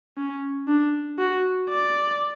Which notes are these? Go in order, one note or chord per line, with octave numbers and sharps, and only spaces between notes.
C#4
D4
F#4
D5